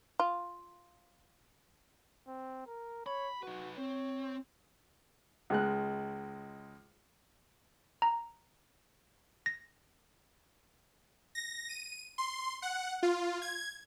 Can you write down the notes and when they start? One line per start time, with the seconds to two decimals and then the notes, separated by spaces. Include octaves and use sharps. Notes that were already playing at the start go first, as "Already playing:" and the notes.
0.20 F4
2.28 C4
2.67 A#4
3.06 C#5 B5
3.43 D#4 F#4 B4
3.78 C4 C#5
5.50 C#2 G#3 F#6
8.02 A#5
9.46 A#6
11.35 A#6
11.69 D#7
12.18 C6
12.62 F#5
13.03 F4
13.42 G#6